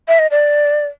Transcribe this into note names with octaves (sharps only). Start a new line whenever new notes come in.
E5
D#5
D5